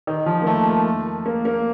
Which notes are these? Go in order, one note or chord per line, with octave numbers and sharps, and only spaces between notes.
D#3
F3
A#3
A3
A#3
A#3